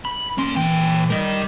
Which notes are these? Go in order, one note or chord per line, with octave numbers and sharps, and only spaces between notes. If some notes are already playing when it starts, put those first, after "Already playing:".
B5
A#3 C#4 C6
A#2 E3 G5
G3 A#4 D#5